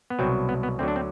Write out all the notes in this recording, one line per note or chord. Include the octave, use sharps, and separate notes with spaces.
B3
C2 B2 F#3 C4
B3
B3
D2 D3 F#3 C4
D4
C4